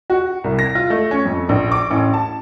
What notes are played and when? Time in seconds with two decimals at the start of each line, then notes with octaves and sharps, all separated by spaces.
0.10 F#4
0.44 C2
0.59 A#6
0.75 F4
0.90 A3
1.11 C#4
1.26 F2
1.49 A#1
1.72 D6
1.91 A1
2.14 A5